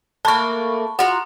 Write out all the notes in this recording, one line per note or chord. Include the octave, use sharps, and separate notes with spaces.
A3 A#3 A5 B5 C#6
F4 F#4 F#5 A#5